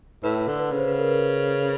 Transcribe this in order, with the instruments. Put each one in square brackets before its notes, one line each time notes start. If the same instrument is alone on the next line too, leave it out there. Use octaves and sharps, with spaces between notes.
[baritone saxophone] A2 [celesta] B4
[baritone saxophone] D3
[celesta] B4
[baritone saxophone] C#3
[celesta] C5
B4
A#4
B4